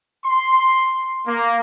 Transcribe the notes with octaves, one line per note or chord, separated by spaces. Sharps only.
C6
A#3